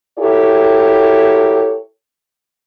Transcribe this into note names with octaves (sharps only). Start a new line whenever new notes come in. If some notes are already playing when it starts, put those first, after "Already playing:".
E4 F#4 G4 A4 A#4 C#5